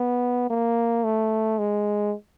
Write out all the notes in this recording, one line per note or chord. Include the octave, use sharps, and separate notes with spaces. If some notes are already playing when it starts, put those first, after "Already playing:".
Already playing: B3
A#3
A3
G#3